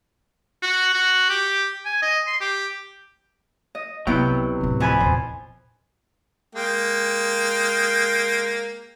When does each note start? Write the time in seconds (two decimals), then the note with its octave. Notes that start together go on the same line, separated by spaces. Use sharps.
0.62 F#4
0.94 F#4
1.29 G4
1.85 G#5
2.02 D#5
2.27 C6
2.40 G4
3.75 D#5
4.07 C2 C3 F#3 B3 E4 G5
4.61 D1 C4
4.80 F2 G#5 B5
5.00 E2 A#2 C5
6.55 G#3 A#3 G5